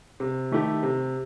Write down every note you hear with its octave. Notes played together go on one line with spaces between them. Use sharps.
C3
D#3 A3 E4 G4
C3